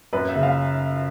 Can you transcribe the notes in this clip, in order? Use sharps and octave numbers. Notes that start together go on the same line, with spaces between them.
F#2 B4
E5
C#3
F5